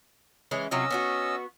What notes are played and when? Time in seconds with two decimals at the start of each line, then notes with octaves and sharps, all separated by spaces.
0.51 E3 G#3 C#4
0.71 C3 F#3 C#4 F4 D#5 E6
0.90 B3 D4 F#4